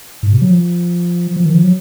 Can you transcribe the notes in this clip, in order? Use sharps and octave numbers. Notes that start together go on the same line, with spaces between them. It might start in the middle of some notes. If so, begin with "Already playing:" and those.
G#2
C3
F#3
F3
F3
D#3
F3
F#3